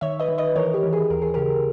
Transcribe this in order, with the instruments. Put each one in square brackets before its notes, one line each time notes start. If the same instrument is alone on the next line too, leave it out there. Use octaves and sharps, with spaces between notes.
[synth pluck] D#3 C#5 E5
B4 D#5
D#3
B4 D#5
E3 A#4 C#5
G4
E3
G#4
D#2 A#4
G#4
C#3 G4 A#4